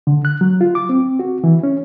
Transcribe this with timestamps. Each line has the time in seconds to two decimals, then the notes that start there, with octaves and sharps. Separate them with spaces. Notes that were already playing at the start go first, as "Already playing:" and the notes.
0.07 D3
0.25 F#6
0.41 F#3
0.61 F4
0.75 D6
0.89 C4
1.19 F#4
1.44 E3
1.63 C#4